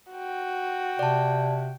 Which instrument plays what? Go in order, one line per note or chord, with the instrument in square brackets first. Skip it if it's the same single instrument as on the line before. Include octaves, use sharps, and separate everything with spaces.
[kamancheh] F#4 G5
[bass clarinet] C3 [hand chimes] D5 A5